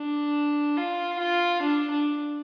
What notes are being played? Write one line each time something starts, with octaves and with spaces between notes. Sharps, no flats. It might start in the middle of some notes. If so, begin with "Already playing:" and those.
Already playing: D4
F4
F4
D4
D4